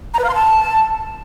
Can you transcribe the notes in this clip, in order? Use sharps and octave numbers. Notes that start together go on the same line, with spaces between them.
A#5
B4
F5
C6
A5